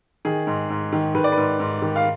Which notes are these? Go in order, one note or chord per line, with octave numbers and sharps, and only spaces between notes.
D#3 G#4
G#2
G#2
D#3
D#3 B4
D5
B4
G#2
G#2
D#3
F5